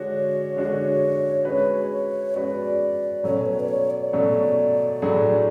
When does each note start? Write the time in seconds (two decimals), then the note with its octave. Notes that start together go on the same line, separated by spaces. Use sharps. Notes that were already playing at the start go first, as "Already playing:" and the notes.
Already playing: D3 G#3 D4 F#4 C#5
0.56 D3 G#3 D4 F#4
1.45 G#3 C#4 F#4 B4
2.34 G#3 C#4 F#4 B4 D5
3.24 B2 F#3 A3 C#4 C#5
3.46 B4
3.60 D5
3.69 C#5
3.90 D5
4.13 B2 F#3 A3 C#4
5.02 A2 F#3 A3 D4 G#4